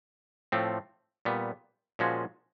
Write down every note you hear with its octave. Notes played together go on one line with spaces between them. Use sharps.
A2 F3 A3 C4
A#2 G3 B3
A#2 F3 G#3 C#4 F#4